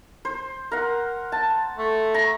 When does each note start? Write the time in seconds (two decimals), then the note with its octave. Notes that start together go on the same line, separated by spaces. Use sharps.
0.25 C5
0.71 A#4 F#5
1.32 A5
1.78 A3
2.14 A#5